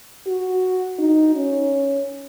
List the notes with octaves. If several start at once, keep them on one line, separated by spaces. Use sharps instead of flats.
F#4
D#4
C#4